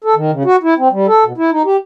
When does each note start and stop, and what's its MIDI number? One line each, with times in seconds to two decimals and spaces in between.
0.04 0.15 69
0.16 0.31 51
0.32 0.43 49
0.45 0.56 66
0.63 0.74 64
0.78 0.88 60
0.91 1.06 55
1.07 1.24 69
1.25 1.33 47
1.37 1.50 64
1.52 1.62 63
1.65 1.77 67